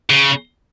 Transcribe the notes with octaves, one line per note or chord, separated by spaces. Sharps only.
C#3